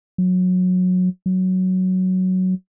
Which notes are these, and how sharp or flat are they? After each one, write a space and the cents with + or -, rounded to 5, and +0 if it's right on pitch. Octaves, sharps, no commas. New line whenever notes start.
F#3 -20
F#3 +5